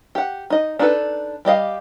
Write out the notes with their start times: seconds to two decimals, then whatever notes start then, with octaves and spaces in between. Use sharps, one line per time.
0.15 G4 F#5
0.50 D#4 D#5
0.79 D4 D#4 G#4 A4 B4
1.45 G3 G4 D#5 F5